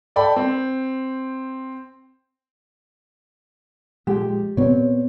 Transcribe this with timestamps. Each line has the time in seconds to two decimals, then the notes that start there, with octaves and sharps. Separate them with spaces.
0.16 A4 D5 G5 B5
0.36 C4
4.07 A#2 F3 G#3 G4
4.57 A#2 B3 C4 C#5